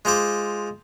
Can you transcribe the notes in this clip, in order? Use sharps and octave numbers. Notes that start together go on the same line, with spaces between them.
G#3 F4 C5 D6